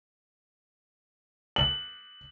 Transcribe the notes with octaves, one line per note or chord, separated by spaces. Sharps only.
F#7